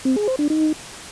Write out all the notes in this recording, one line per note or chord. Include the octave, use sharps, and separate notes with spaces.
C4
G#4
C5
D4
D#4